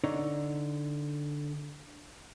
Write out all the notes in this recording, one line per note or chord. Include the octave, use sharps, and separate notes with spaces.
D3 D#4 C#5